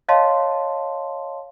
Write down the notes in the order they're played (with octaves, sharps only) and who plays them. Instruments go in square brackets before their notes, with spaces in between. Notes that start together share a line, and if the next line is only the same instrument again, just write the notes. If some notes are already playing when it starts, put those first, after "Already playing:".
[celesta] C#5 D#5 F5 A5 C6